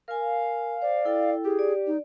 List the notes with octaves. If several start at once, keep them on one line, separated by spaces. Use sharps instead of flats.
A#4 F5 G#5
C5 D5
E4 A4 G5
G4 G#4
D5
D#4